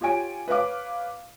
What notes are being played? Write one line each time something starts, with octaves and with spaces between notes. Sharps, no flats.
F4 G4 C#5 G#5 D7
B4 C#5 F5 D6